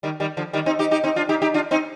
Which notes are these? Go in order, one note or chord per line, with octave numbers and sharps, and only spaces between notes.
D#3 G3
D#3 G3
D3 F3
D#3 G3
C4 D#4
D#4 G4
D#4 G4
C4 D#4
D4 F4
D#4 G4
D#4 G4
D4 F4
C4 D#4